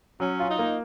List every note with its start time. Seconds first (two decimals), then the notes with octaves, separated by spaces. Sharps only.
0.20 F#3 C#4
0.40 F4
0.50 D#4
0.59 A#3